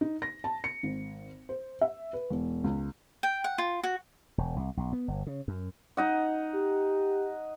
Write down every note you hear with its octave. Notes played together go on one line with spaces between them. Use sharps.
D#4
A#6
A5
C#7
G#1
C5
E5
B4
E1
C#2
G5
F#5
F4
F#4
E1
C2
B1
B3
G1
C#3
F#2
D#4 D#5 F#5
G4